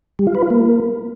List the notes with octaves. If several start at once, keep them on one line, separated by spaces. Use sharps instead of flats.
G3
F4
B4
F4
A#3